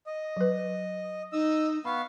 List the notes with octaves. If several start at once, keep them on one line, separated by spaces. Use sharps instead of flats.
D#5
F#3 B4
D#4 D#5 E6
B3 F5 B5 C#6